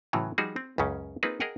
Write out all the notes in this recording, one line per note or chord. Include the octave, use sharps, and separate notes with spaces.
A2 C#3 E3 F#3
F3 G3 D#4 F#4 G#4
C4
C#2 F#2 C#3 C#4
A#3 C4 D#4 F4 G#4 B4
G#4 A#4 D#5 F#5 G5